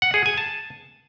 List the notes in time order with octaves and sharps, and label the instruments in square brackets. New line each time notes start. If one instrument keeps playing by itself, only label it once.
[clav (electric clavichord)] F#5
G#4
G#5
A5